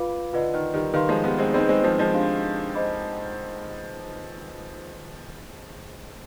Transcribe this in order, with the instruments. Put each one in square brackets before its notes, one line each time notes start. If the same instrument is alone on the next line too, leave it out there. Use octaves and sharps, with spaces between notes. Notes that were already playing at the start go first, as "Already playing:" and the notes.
Already playing: [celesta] F4 B4 F5 B5 D6
[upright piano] D3 [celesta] F4 B4 D#5
[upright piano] D#3
D#3 G3
[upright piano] D#3 G3 [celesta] B4 F5 C6
[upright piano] F3 G#3
G3 B3
G#3 C4
[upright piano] G#3 C4 [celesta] D#4 B4 D#5 G5 B5
[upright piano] G#3 C4
F3 G#3
F3 G#3
[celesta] D4 G4 C5 F5 C6
C5 D#5 B5 D6